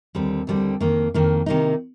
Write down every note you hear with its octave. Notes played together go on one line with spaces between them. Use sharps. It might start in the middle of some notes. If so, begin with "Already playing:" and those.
D#2 D3 G3 C4
D#2 D3 G3 C4
F2 D#3 A#3
F2 D#3 A#3
C3 D#3 A#3 D#4